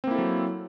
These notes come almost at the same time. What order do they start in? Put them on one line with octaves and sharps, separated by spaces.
C4 A#3 E4 A4 F#3